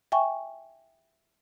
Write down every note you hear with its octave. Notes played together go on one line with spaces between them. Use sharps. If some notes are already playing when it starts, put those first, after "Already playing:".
E5 G5 G#5 C#6